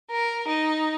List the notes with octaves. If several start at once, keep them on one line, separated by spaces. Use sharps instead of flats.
A#4
D#4